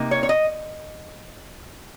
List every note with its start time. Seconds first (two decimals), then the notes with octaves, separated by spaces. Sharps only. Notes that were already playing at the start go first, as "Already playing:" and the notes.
Already playing: C3 A#3 D#4
0.11 C#5
0.23 C#5
0.29 D#5